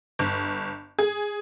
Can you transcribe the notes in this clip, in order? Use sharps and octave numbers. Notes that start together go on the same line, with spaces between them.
G1
G#4